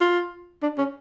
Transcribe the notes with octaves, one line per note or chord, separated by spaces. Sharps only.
F4
D4
C#4